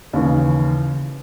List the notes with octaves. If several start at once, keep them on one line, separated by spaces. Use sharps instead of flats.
D#2 C#3 E3